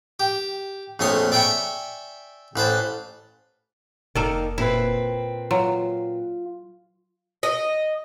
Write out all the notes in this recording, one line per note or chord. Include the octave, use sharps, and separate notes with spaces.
G4
A#1 F2 A3 C#5 C6 D#6
D5 E5 G5 G#5 B5 C#6
A1 B4 C5 A5
F1 D#3 A#3 A4 D5
A#2 C4 E4 B4
F#3 F4
D#5